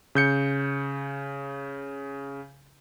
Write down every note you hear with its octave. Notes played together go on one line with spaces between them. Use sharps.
C#3 G6 C#7